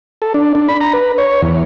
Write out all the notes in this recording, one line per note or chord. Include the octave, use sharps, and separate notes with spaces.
A4
D4
D4
B5
A#5
B4
C#5
E2